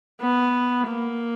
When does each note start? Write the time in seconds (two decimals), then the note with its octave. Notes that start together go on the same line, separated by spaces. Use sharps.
0.21 B3
0.87 A#3